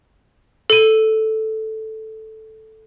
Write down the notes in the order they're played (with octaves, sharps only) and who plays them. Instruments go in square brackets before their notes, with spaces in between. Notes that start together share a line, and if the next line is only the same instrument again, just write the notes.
[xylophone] A4 D#7